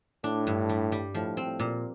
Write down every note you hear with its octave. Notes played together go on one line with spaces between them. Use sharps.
A2 D4
G2
G3
G3
A2 F3
C4
A2
A#2